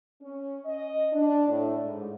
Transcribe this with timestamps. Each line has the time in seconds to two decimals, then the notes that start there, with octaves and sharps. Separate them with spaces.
0.21 C#4
0.65 D#5
1.13 D4
1.48 A2
1.85 G#2